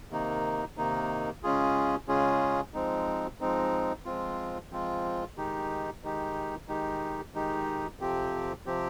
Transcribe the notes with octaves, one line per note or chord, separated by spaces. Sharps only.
C3 D#3 A#3 D#4
C3 D#3 A#3 D#4
C#3 G#3 C#4 F4 G#4
C#3 G#3 C#4 F4 G#4
F3 G#3 C4 D#4
F3 G#3 C4 D#4
F3 G#3 C4 F4
F3 G#3 C4 F4
D#3 G#3 D#4 G4
D#3 G#3 D#4 G4
D#3 G#3 D#4 G4
D#3 G#3 D#4 G4
F2 C3 F3 C4 G4
C3 F3 C4 G4